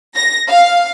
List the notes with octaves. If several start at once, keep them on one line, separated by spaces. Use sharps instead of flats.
A#6
F5